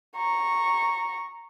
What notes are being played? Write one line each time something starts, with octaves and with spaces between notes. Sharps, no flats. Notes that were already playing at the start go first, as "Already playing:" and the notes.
A#5 C#6